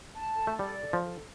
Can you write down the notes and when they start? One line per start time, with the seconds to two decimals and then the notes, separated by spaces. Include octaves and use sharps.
0.14 A5
0.36 A4
0.47 A3
0.59 G3 D5
0.81 A4
0.93 F3
1.04 A4